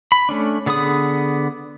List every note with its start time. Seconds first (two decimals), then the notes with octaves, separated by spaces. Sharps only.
0.12 B5
0.29 A3 C#4 D4
0.66 D3 B3 G#4 B4 D#6